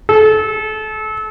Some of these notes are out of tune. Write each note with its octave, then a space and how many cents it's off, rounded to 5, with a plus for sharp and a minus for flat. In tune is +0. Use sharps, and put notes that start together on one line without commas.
A4 -30